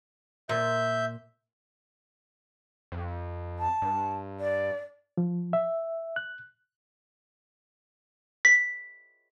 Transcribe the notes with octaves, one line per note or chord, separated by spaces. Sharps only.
A#2 E5 G6
F2
A5
G2
D5
F3
E5
F#6
B6